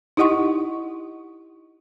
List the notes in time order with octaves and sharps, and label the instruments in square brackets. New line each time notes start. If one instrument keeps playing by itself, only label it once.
[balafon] D#4 E4 G4 D#5 F#5 C#6